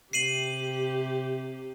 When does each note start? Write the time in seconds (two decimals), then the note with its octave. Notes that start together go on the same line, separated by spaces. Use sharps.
0.13 C3 G4 C7 D#7 F#7